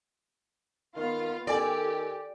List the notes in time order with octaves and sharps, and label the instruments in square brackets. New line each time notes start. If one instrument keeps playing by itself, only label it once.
[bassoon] D#3 [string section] B3 F4 F5
[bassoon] D#3 [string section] G4 [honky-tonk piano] A4 G#5 [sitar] D5